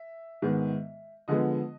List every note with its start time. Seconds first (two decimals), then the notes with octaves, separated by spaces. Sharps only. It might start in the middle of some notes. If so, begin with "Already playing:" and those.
Already playing: E5
0.42 G#2 D#3 G#3 B3
1.28 D3 F3 G#3 B3 D#5